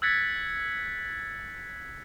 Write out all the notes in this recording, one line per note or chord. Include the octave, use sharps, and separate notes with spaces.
E6 F#6 G#6 A6 B6 C#7